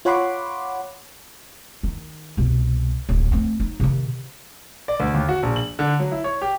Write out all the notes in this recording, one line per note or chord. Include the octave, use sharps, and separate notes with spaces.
F4 C#5 F#5 B5 C6 D6
D#3
C2 B2
D1 G#1
A3 C4
D#4
C3 D#3
D5
D2
D#2
F#4
A#1
F#7
D3
F#3
E4
C#5
G4